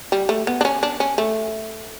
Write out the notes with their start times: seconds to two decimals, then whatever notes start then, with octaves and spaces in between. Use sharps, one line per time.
0.12 G3
0.29 A3
0.47 B3
0.61 D4
0.65 C#4
0.83 D4
1.00 C#4
1.18 A3